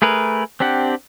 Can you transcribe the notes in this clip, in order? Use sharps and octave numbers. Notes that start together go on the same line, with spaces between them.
A3 G#4 A#4 B4
C4 D4 G4 F#5